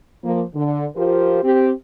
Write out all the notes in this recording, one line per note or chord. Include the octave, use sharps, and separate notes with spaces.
F3 A#3
D3
F3 F4 G4 A#4 C5
C4 G4